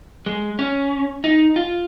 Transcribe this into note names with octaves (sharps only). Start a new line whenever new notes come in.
G#3
C#4
D#4
F4